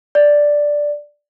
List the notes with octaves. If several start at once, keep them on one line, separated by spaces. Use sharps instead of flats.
D5